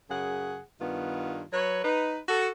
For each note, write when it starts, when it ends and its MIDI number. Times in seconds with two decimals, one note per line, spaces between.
0.10 0.60 42
0.10 0.60 49
0.10 0.60 68
0.10 0.60 78
0.81 1.44 43
0.81 1.44 51
0.81 1.44 59
0.81 1.44 65
1.52 1.83 54
1.52 1.83 71
1.52 1.83 73
1.84 2.19 63
1.84 2.19 71
2.28 2.49 66
2.28 2.49 69